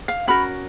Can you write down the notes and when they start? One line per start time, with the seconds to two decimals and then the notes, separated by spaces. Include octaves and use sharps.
0.08 F5
0.27 C#4 F#4 A#4 B5